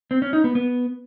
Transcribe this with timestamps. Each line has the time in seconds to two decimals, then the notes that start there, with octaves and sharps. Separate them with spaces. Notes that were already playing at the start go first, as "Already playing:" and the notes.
0.11 C4
0.22 C#4
0.33 D#4
0.44 B3
0.55 B3